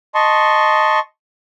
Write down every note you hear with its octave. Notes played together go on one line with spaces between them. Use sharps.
D#5 A5 C6 C#6